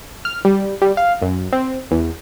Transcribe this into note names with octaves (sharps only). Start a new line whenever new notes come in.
F6
G3
G3
F5
F#2
C4
E2